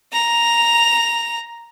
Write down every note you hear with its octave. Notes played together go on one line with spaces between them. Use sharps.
A#5 F7